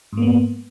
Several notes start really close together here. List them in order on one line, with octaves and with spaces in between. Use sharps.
G#2 A#3 B3